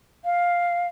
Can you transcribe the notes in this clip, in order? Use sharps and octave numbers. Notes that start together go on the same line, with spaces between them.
F5